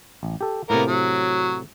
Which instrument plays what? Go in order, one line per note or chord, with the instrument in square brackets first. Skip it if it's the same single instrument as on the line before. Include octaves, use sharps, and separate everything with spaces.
[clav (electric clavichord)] A1
G4 A4
[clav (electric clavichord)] A2 C3 [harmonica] A#3 B3 A#4
[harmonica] F#3